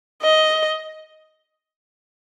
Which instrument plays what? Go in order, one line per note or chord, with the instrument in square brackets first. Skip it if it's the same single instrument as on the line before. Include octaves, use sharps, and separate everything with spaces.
[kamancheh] D#5